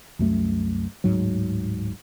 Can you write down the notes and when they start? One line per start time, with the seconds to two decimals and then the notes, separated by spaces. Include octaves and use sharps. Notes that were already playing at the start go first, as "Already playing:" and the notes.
0.19 C2 F#2 A3
1.04 D1 G#2 F#3